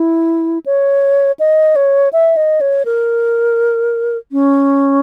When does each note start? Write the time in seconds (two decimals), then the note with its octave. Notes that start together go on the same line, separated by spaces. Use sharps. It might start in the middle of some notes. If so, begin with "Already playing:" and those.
Already playing: E4
0.66 C#5
1.40 D#5
1.76 C#5
2.13 E5
2.37 D#5
2.61 C#5
2.85 A#4
4.32 C#4